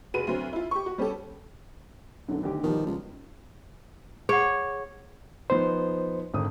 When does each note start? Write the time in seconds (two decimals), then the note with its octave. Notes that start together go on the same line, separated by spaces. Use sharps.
0.14 F1 F#4 G#4 B4 D#7
0.27 D2 F#3 C4
0.53 E4 F4
0.71 G4 C#6
0.86 F#4
0.98 G3 C#4 G4 A4
2.28 B1 F#2 D3
2.43 D2 D#3 G4
2.63 B2 D#3 F3 G3
2.87 C#2
4.29 G#4 C#5 F#5
5.50 F3 B3 D#4 C5
6.33 G#1 D3 D#6